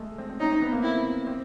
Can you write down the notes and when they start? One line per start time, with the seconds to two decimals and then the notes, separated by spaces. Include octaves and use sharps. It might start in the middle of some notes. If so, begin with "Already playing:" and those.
Already playing: G#3 A3
0.18 C4
0.30 C4
0.40 C#4 D#4
0.51 C4
0.62 B3
0.72 A#3
0.83 C4 E4
1.27 C4